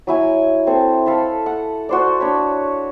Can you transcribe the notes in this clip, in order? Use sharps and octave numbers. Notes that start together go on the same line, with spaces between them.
F#3 E4 G#5
C4 A4 C5
A4 F5 A5 B5
F#5
F#4 C5 D5
D4 C#5 B5